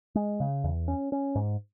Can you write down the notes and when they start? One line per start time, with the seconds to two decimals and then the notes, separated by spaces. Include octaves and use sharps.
0.15 G#3
0.40 C#3
0.64 E2
0.88 C#4
1.12 C#4
1.35 G#2